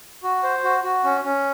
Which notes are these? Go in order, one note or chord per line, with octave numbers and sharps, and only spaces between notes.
F#4
C5
F#4
F#4
C#4
C#4